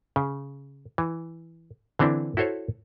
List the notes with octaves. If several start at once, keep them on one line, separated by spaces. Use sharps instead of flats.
C#3
E3
D3 E3 C4 D4 E4
E4 F#4 A4 C5 C#5